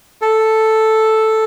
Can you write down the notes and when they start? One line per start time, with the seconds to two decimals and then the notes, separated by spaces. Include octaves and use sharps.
0.22 A4